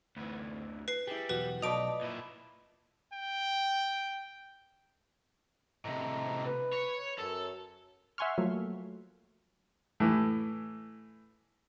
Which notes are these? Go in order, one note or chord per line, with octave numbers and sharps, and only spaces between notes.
D2 E3
B4 C7
G3 E4 G#4
B1 E2 F#4 B4
B1 F3 A3 B4 D5 D#5 D7 F7
A#2 E4
G5
A2 C3 D#5 E5 A#5
B4
C#5
F#2 A4
E5 F#5 G#5 C6 C#6 F6
F3 F#3 A3 A#3
A2 E3